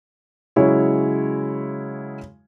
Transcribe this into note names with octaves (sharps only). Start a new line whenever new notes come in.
C#3 F#3 G#3 E4 C#5